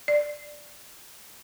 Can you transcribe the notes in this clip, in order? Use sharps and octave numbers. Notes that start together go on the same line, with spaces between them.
D5